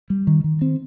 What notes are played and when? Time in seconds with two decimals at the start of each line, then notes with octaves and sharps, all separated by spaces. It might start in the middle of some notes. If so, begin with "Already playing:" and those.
0.10 G3
0.27 D#3
0.44 D#3
0.62 C4